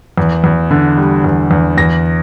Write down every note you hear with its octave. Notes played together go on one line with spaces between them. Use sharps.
E2
E2
D3
G3
E2
E2
E2 A#6